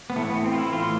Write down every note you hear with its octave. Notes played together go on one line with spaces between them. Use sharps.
B3
A2 E3 A3
B3
C4
F4
E4
A2 E3 F4